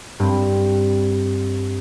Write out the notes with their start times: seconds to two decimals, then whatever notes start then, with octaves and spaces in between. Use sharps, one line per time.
0.19 G2 C4